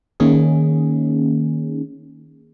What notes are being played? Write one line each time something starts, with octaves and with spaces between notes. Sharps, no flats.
D#3 A#3 C#4 D#4 G#4